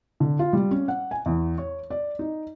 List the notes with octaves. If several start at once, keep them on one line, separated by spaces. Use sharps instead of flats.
D3
F4
G3
C#4
F#5
G#5
E2
C#5
D5
D#4